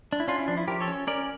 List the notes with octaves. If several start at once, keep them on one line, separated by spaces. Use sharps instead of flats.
D4
E4
C#4 D4 F4
E4
F3 D4
E4
F3 G4 A#4
A4 C#5
C#4
C#4 A#4 D5